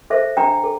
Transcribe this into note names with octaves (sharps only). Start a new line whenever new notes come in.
A4 C5 E5
D4 G5 A#5
A4